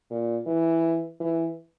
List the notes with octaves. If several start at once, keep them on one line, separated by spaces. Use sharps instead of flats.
A#2
E3
E3